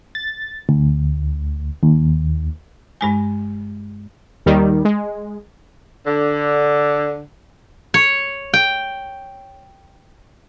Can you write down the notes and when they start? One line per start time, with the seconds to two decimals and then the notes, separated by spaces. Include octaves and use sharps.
0.15 A6
0.69 D2
1.83 D#2
3.01 G2 G#3 G#5
4.46 D#2 D#3 G3
4.85 G#3
6.06 D3
7.94 C#5
8.54 G5